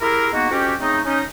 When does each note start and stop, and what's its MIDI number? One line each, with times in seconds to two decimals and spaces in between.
0.01 0.28 64
0.01 0.28 67
0.01 0.28 68
0.01 0.28 70
0.33 0.49 56
0.33 0.49 58
0.33 0.49 59
0.33 0.49 63
0.33 0.49 66
0.51 0.74 41
0.51 0.74 61
0.51 0.74 66
0.51 0.74 67
0.80 0.99 49
0.80 0.99 57
0.80 0.99 60
0.80 0.99 63
1.05 1.21 61
1.05 1.21 63